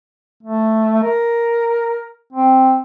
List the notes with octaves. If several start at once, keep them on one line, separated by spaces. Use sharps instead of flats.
A3
A#4
C4